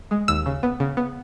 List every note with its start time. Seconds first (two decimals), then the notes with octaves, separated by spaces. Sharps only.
0.11 G#3
0.28 D#2 E6
0.46 C#3
0.63 B3
0.80 C#3
0.97 B3